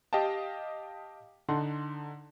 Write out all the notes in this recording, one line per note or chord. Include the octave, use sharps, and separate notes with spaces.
G4 D#5 F5 G5 A5
D3 D#4 F#5 A5 C6